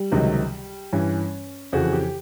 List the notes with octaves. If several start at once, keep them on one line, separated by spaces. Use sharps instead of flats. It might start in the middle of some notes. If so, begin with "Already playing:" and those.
Already playing: G3
C#2 C3 D#3 F#3
G2 E3 C#4
F2 C#3 E3 F#4
G4